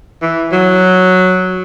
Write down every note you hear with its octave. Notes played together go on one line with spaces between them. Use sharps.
E3
F#3